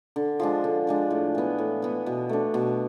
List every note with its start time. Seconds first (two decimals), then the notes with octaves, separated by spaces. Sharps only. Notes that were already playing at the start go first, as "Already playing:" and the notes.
0.16 D3
0.40 F3 G#3 D4
0.64 D3
0.87 F3 G#3 D4
1.10 A2
1.35 E3 B3
1.58 A2
1.82 E3 B3
2.06 B2
2.29 A3 D4
2.54 B2